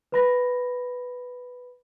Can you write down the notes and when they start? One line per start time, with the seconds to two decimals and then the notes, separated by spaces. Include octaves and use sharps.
0.12 B4 B5 A#6